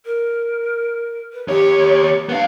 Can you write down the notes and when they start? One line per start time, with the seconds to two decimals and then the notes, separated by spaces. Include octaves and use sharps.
0.05 A#4
1.33 B4
1.48 D#2 G4 C#5
2.29 B3 D4 F5